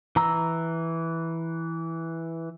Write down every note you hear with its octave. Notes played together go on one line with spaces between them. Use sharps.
E3 A#5 E6